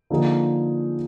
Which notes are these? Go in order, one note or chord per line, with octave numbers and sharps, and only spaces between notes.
D3 F3 A#3 D#4 G#4